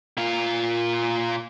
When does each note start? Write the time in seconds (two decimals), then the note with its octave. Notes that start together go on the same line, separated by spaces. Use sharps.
0.17 A#2 F4